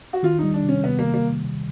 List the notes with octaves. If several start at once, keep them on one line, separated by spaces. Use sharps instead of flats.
F#4
D#3 F4
G3 D#4
D4
C3
C#4
C3 B3
D#3 A#3
A#3
G3